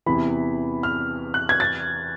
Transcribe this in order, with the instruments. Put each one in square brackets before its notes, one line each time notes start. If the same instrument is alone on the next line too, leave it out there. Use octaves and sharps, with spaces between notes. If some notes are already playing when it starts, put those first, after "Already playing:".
[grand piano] E2 C3 E3 [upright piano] B5
[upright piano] F6
F#6
G#6
A6